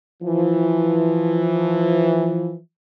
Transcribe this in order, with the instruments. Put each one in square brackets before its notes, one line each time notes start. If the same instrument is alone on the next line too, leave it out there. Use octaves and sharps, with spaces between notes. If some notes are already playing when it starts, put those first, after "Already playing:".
[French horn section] E3 F3